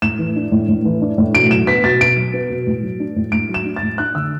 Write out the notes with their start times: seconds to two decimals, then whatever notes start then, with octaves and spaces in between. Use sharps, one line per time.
0.02 A2 E7
0.19 E3
0.36 D4
0.52 A2
0.69 A2
0.85 E3
1.01 D4
1.18 A2
1.34 B2 D7
1.51 F#3 E7
1.67 B3 B6
1.84 B2 A6
2.01 B2 D7
2.17 F#3
2.34 B3
2.50 B2
2.67 A2
2.83 F#3
3.00 D4
3.16 A2
3.32 A2 D7
3.49 F#3
3.54 E7
3.65 D4
3.76 A6
3.83 A2
3.98 D4 F#6
4.15 D3 E6